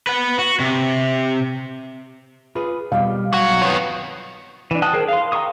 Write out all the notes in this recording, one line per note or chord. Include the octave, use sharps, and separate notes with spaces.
B4 F#5
F#4
C3
F4 G#4 B4
B2 G3 G4 F5
F#3 F#4
B1
D#3 B3 C#5
E3 D4
F#4 G5 A5 D#6 F#6
G#4 A#4 C5
F5 C6
G5 A#5 C6 C#6 D#6